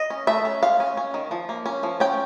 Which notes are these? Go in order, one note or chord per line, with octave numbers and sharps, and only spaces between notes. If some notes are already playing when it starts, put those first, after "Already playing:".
Already playing: D#5
C#4
A3 E5
C#4
G#3 F5
C#4
C#4
D#3
F3
A#3
C#4
F3
C#4 G5